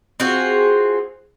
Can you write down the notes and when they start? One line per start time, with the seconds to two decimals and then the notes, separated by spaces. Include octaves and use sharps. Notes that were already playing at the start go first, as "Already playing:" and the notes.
0.20 C4 F4 F#4 G#4